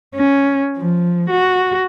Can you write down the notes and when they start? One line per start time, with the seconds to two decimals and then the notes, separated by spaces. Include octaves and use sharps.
0.15 C#4
0.77 F3
1.29 F#4